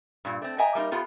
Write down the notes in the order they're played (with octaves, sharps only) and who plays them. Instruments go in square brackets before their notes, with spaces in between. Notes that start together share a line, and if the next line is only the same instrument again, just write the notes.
[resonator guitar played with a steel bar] G2 A#2
A3 C4
D#5 E5 G5 G#5 A#5
G3 A#3 D#4
B3 F4 G4 A4